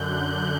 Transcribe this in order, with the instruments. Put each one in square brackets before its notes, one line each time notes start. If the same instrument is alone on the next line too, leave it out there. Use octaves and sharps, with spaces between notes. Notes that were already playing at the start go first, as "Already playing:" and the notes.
Already playing: [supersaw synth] F#2 D3 F#6 G6